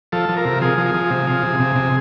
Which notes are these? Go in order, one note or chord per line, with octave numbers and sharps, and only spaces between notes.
F3 A4
F3
A#4
C3
F3 G#4
F3
G#4
F3
C3
F3
C3
C3
C3